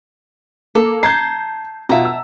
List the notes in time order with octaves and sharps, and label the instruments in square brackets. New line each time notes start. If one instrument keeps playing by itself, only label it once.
[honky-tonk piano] A#3 [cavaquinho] A4
[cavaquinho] A5 A#5 [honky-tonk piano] G6 G#6 C7
[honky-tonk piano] B2 F4 [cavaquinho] E5 A5 A#5
[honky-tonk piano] E6